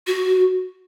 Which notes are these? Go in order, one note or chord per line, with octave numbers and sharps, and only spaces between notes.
F#4